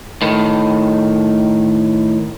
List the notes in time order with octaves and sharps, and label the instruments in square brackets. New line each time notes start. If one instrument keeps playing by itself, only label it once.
[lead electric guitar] A2 D#3